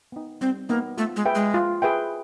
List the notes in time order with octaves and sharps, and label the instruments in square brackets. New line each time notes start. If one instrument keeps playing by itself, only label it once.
[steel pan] B3 D#4
[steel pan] G3 [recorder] C4
[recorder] A#3 [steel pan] B3 D#4
[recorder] A3 [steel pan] F4
[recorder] G#3
[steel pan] G#4 B4 E5 G5
[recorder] G#3
[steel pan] F4
G#4 B4 E5 G5